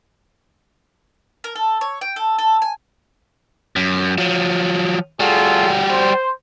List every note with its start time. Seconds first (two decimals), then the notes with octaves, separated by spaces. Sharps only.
1.44 A#4
1.55 A4
1.81 C#5
2.01 G5
2.16 A4
2.38 A4
2.62 G#5
3.76 F#2
4.18 F3 F#3
5.20 G3 F4 F#4 G#4 A4
5.90 C5